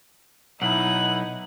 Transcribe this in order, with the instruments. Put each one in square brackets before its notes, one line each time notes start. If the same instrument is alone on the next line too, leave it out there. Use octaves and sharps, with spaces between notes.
[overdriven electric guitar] B1 [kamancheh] D#4 E4 [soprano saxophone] F#5 [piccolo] F#7